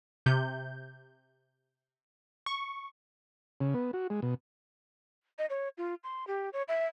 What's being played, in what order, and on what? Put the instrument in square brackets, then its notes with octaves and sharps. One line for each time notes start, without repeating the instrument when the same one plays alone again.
[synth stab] C3 G6
C#6
[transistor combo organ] C#3
B3
F#4
G#3
B2
[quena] D#5
C#5
F4
C6
G4
C#5
E5